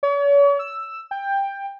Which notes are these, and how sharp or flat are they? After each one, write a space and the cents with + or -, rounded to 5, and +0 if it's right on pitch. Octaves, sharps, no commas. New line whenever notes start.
C#5 +40
E6 +5
G5 +15